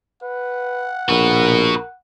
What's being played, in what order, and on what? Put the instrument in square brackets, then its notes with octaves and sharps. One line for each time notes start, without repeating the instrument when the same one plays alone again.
[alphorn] B4 [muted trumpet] F#5
[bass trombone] A#1 [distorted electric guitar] F#4 B4 [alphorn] A#4